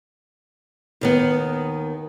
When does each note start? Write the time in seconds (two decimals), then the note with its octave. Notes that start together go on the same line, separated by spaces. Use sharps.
1.01 D#2 D#3 B3